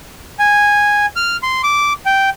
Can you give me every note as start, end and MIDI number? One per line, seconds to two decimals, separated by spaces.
0.39 1.06 80
1.16 1.37 89
1.43 1.62 84
1.63 1.93 86
2.06 2.30 79